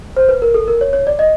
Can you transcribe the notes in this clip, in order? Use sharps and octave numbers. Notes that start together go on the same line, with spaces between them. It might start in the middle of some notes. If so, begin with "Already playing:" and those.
C5
B4
A#4
A4
A#4
C#5
C#5
D5
D#5